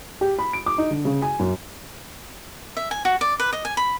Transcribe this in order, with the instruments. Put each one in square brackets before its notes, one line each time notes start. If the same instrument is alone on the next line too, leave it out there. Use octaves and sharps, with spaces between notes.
[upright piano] G4
B5
D7
D6
D#4
D3
C#3
G#5
F#2
[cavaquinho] E5
G#5
F#4
D5
B4
D#5
G#5
B5